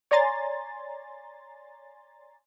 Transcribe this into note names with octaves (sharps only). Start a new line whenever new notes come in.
C#5 D5 G#5 A#5 C6 A6